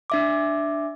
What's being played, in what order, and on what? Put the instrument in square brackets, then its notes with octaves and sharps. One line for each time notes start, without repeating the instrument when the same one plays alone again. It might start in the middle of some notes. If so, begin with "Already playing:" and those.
[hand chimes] D4 E5 D6